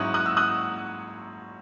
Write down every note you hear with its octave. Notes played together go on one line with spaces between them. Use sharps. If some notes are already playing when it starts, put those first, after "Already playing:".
Already playing: G#2 F#3 C#4 E4 D#6 F#6
D#6 F#6
E6
D#6 F#6